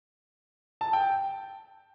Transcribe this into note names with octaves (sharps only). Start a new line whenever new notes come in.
A5
G5